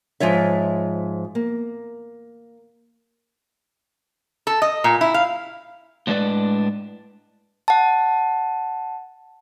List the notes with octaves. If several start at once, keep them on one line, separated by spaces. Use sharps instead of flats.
G#2 F3 F4 C#5 E5
A#3
A4
D#5
A#2
E4
F5
A2 F#3 G#3 D4 B4 D5
F#5 A5